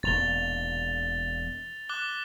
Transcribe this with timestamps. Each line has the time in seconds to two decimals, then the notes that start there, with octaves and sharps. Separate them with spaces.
0.03 E1 A#2 A6 F7 G7
1.89 D6 F#6 G7